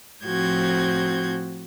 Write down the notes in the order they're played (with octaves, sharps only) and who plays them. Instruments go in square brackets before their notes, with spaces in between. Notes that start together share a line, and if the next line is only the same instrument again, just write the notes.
[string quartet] A2 F3 C4 F#4 G6 G#6